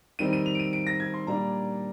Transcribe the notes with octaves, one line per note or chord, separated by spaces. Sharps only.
D#3 G3 C4 D#4 D#7
D#7
F7
D7
D#7
D7
A#6
G#6
C6
A#2 G3 D4 A#5